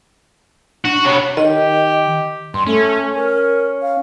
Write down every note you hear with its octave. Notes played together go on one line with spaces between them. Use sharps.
D4 F#4
C3 B3 C#5
D#3 G4 D#5
G2 C6
A3 C#4
A#4
F5